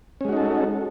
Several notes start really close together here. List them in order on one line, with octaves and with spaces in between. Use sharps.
C#4 G#3 F#4 D#4 A4